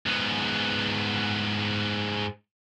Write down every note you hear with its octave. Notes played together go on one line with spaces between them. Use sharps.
G#2 B3